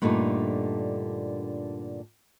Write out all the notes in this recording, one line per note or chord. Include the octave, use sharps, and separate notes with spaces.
G2 A#2 D3 A3 D4 D#4